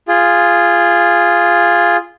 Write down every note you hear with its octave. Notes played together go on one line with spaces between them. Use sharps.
F4 G#4